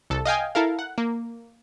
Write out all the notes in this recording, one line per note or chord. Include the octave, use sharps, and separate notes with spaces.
C2 A4
D#5 F5 G5 G#5
E4 A4 A#4 F5
F#5
A#3